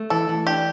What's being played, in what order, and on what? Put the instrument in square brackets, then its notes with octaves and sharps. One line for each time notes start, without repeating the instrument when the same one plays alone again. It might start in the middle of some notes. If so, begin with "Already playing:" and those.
Already playing: [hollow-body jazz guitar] A3
[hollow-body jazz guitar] E3 [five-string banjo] A4
[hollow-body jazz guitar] E3
[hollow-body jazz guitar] D4 [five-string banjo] G4